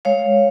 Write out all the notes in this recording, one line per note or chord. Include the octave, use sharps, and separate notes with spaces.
G#3 C#5 F5